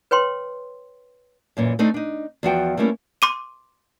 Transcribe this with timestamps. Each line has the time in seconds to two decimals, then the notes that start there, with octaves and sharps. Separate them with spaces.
0.11 B4 C#5 G5 C6
1.57 F#2 A#2 E3
1.79 A3 C4 D4 D#4
1.94 D4 D#4
2.43 E2 F3 F#4 G5
2.77 G3 A3 A#3 C#4 E4
3.22 C6 D6 D#7